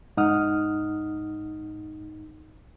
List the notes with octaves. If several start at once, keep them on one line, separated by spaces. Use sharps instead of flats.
G#2 D#4 F#5 D#6 F6